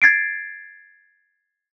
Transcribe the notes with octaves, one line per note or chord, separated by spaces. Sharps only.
G#6 A6 C7 D7